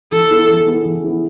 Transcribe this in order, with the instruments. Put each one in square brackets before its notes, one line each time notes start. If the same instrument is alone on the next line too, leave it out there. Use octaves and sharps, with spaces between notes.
[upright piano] E3 [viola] A4
[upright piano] B3 E4 G#4
E3
B3 E4 G#4
E3
B3 E4 G#4